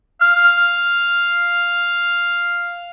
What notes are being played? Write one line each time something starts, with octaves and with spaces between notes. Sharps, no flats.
F5 F6